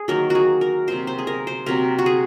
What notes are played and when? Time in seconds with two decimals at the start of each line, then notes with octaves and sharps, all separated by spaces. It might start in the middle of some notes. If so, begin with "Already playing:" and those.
Already playing: G#4
0.08 D#3 F#3 A#3 A#4
0.30 F#4 G#4
0.61 A#4
0.87 C3 F#3 A#3 C5
1.07 C5
1.19 G#4
1.27 A#4
1.47 C5
1.66 C3 F#3 A#3 A#4
1.99 F#4
2.06 G#4